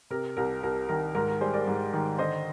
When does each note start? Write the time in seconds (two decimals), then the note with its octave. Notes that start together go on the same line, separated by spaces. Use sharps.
0.10 C3 A#4
0.37 C2 A#4
0.63 C2 A#4
0.89 D#3 A#4
1.15 G#2 A#4
1.28 A#4
1.40 G3 G#4 C5
1.54 A#4 D5
1.67 G#2
1.93 D#3
2.19 D3 C5 D#5